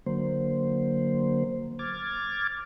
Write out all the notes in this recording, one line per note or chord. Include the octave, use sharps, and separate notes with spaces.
D3 F#3 A#3 C5
D6 F6 G#6 A6